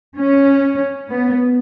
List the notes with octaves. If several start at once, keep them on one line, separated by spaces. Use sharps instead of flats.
C#4
B3